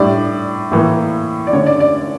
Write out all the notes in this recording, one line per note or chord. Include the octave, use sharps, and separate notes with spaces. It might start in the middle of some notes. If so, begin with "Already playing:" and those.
Already playing: A2 G3 D4 D5
A2 E3 A#3
D5
D3 A3 C#4 C#5
D5
D5